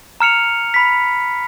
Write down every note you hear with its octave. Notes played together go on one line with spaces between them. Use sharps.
A#5 F6 C#7 F7
B5 B6